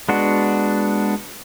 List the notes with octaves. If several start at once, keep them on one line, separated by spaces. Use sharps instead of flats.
G#3 B3 D4 F#4